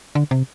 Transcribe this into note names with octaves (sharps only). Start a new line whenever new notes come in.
D3
C3